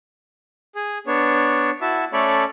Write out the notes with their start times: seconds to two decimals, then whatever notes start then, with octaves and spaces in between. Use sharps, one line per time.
0.75 G#4
1.07 B3 D4 C#5
1.81 E4 F#4 E5 A5
2.13 A3 C#4 A4 C#5 D5 B5